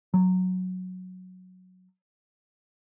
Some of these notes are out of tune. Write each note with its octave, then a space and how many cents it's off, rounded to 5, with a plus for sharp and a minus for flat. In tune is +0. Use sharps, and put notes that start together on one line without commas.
F#3 -5